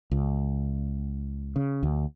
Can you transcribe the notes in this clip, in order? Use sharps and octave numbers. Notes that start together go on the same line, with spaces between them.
C#2
C#3
D2